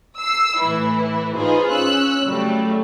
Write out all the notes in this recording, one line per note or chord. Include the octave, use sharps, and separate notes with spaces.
E6 C7
A2 E3 E4
D#4 F4 G#4 B4 C5
C#4 E6 F#6
C#3 F#3 G3 A3